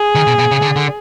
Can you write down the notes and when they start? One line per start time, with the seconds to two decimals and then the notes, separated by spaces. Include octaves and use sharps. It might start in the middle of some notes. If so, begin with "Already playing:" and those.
Already playing: G#4
0.15 D#3
0.27 B2
0.39 B2
0.51 C#3
0.62 D3
0.76 D3